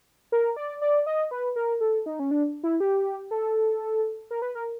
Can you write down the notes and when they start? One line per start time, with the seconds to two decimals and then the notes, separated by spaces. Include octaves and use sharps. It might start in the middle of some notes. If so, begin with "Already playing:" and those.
0.32 A#4
0.56 D5
0.81 D5
1.06 D#5
1.31 B4
1.56 A#4
1.81 A4
2.06 D#4
2.19 C#4
2.31 D4
2.63 E4
2.80 G4
3.31 A4
4.31 A#4
4.42 B4
4.55 A#4